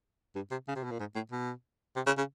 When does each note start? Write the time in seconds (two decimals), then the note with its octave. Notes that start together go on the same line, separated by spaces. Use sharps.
0.36 G2
0.51 C3
0.68 C#3
0.75 C3
0.84 B2
0.91 A#2
0.99 G#2
1.15 A2
1.31 B2
1.96 C3
2.06 C#3
2.18 C#3